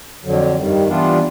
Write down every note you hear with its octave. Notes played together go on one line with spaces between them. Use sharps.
F2 D3 F#3
G2 D#3 G3
E3 G3 B3 D4 F4